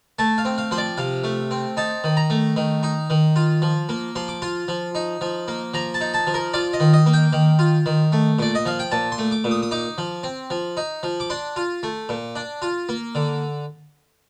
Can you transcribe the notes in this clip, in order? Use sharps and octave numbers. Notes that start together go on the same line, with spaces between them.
A3 A5
F5
C4
F5
F3 C5
D5
C3 F5
A3
C4
D#4 A5
D#3
A#5
A3
D#3
D#4
D#3
F4
F3
A#3
F3 C6
D6
F4 C6
F3
D#4
F3
A#3
F3 A#5
A5
D#4
A5
F3
A#4
F4 D5
D#5
D#3
D#5
A#3
G5
D#3
F4
D#3
A3
A#2 D5
D#5
F3 F5
G5
A#2 A5
C6
A3
D6
A#2
D#6
D#6
D#4 D6
F3
C4
F3
D#4
F3
D6
D4 C6
F4
A3
A#2
D4
F4
A#3
D3